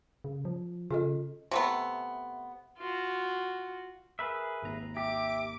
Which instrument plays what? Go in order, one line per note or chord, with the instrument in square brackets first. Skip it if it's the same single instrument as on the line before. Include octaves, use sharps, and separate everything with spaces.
[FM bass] C#3
F3
[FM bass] C#3 [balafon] F4 A4 D#5
[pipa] C3 A3 B3
[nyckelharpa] F4 F#4
[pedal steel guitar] G#4 B4 E5 [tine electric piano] A#4
[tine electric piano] G#1 D#2 A#5
[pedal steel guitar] G4 [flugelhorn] E5 [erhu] D6